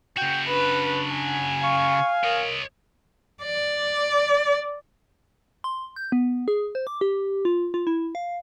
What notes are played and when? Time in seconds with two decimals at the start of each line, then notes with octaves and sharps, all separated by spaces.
0.17 C#3 F#4 G5
0.49 D4 B4
1.13 G#5
1.63 F5 C#6
2.24 A#4 C#5 D#5
3.43 D5
5.64 C6
5.96 G6
6.12 B3
6.48 G#4
6.75 C5
6.87 D6
7.01 G4
7.45 F4
7.74 F4
7.87 E4
8.15 F5